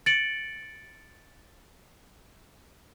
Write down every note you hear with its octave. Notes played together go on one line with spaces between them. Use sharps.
A6 C#7 D7 F#7